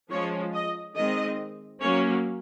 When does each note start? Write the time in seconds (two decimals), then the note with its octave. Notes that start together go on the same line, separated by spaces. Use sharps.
0.10 F3 G#3 C#4 C#5
0.53 D#5
0.96 D#3 G#3 C4 D#5
1.82 F#3 A#3 C#4 C#5